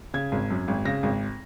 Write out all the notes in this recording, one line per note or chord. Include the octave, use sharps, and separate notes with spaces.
C#3 G#6
G#1
F#2
G#1
C#3 A#6
G#1